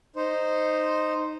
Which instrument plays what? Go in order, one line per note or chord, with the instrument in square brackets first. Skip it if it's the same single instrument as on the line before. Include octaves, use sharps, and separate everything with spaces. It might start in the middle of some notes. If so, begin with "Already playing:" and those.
[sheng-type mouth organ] D#4 C5